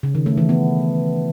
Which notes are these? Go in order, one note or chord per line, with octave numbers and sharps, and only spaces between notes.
C#3
D#3
A3
E3
B3